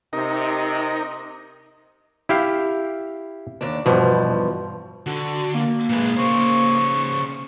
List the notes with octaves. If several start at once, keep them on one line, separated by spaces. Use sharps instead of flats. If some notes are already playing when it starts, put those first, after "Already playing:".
C3 D#4 A#4
E4 G4 F5
D#2 D4
E2 G2 B2 F3
D3 F#4
A#3
A#2 G#3 B4
C#3 C5 C#6